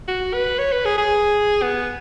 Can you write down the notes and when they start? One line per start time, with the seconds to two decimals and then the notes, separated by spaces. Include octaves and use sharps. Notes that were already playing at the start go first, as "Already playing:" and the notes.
0.08 F#4
0.33 B4
0.59 C#5
0.72 B4
0.85 G#4
0.98 G#4
1.62 B3